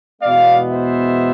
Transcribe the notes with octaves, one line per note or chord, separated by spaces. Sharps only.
E2 B2 G#3 B3 D5 F5
C5 E5